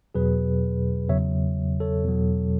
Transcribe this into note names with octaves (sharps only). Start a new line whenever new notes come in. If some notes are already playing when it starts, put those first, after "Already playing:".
E2 B2 F#3 G#4 B4
E2 C#3 F#3 C#5 E5
A4 C#5
E2 B2 F#3